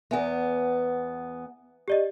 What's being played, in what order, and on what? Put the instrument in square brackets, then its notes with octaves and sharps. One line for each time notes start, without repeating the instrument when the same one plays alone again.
[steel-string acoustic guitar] E2 B3 [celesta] E5 G#5
[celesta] G4 D5 D#5